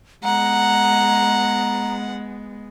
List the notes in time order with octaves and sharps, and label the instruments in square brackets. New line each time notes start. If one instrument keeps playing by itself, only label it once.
[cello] G#3 B3 [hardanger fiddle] F#5 [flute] A#5